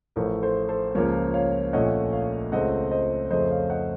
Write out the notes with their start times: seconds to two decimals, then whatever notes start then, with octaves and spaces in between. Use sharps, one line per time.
0.16 A1 A2 F3 A3 A#4
0.42 A4 C5
0.69 A4 C5
0.95 C#2 C#3 F3 A#3 C#4 A#4 C#5
1.34 C#5 F5
1.73 A#1 A#2 A3 C#4 D#5 F#5
2.12 C#5 F5
2.52 C#2 C#3 A3 C4 D#5 F#5
2.91 C5 D#5
3.31 F2 C#3 F3 A3 C5 D#5
3.50 C#5 F5
3.70 D#5 F#5